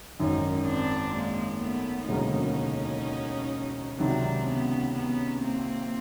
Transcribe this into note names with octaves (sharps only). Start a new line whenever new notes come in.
G#1 F#2 D#3 C#4 D#4
C4 D4
G#3 A#3
A3 B3
E1 D2 C#3 F#3 A#3 C#4 D#4
C#2 C3 D#3 F#3 C4 D4
B3 C#4
B3 C#4
A#3 C4